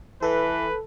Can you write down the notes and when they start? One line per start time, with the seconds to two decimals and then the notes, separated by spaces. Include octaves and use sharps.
0.22 E3 A4 B4